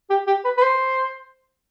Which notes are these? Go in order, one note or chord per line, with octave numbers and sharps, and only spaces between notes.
G4
G4
B4
B4
C5